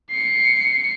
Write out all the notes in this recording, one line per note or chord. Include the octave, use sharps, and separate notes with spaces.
C7 C#7